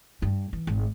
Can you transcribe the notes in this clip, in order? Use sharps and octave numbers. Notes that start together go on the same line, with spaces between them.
G2
E3
G#1